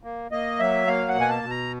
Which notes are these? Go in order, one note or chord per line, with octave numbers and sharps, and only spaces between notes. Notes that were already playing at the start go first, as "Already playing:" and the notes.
A#3
A#3 D#5
F#3 E5
A#3 F5
F#5
B2
G#5
A5
B2
A#5